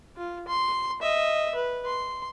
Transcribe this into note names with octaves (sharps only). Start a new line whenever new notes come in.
F4
C6
D#5 E5
B4
C6